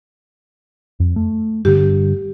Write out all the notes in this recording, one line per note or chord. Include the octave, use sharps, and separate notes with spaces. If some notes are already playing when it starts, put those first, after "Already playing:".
F2
A3
G2 D3 G4